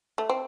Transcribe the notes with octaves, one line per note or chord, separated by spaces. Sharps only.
A3
C4